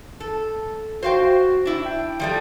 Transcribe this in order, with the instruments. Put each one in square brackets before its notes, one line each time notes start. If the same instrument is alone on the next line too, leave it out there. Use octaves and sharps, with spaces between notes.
[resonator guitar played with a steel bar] A4
[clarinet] F#4 [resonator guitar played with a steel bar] C5 F5 G5
[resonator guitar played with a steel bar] D4 E4
[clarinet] G5
[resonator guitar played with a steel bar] F3 G3 A3